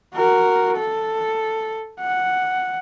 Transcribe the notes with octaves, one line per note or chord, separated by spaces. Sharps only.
F#4 A#4
A4
F#5